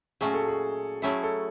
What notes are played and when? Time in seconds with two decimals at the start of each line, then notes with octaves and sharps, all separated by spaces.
0.21 A#2 F#3 A3 C#4 F#4 G#4
0.34 A4
0.48 G#4
1.02 F#3 A3 C#4 E4 G#4
1.23 A4